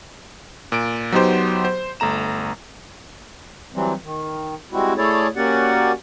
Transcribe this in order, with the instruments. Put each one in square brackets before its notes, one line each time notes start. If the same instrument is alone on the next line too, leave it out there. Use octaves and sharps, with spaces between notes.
[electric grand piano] A#2 D7
F#3 B3 D#4 G4 C5
C5
G1 A3 A#5 E7
[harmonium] E3 F#3 G3 C4
D#3
G3 G#3 C4 E4 F#4
A3 E4 G#4 A4 C#5 D5
A#3 C#4 F#4 G4 D5 F#5